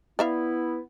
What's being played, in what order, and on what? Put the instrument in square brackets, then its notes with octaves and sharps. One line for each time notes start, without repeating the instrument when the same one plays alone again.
[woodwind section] B3 E4 [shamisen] D5 E5 F5